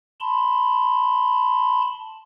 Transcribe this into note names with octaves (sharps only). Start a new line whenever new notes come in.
A5 B5 C6